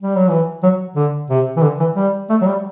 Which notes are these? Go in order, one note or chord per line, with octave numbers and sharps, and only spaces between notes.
G3
F#3
E3
F#3
D3
C3
E3
D3
E3
G3
A3
F#3
G3